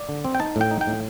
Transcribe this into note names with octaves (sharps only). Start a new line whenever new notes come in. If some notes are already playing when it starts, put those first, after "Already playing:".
Already playing: D5
D3
C4
G5
D#4 A5
A2 G5
D#4
G5
A2